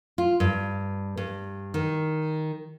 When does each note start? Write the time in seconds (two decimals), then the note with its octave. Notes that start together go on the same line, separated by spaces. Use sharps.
0.18 F4
0.40 G2
1.17 G2
1.74 D#3